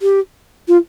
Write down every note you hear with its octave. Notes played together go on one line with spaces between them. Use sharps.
G4
F4